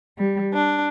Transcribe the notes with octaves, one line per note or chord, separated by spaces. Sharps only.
G3
D4